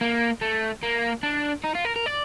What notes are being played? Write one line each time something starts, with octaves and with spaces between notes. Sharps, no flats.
A#3
A3
A#3
D4
D#4
F4
A#4
A#4
D5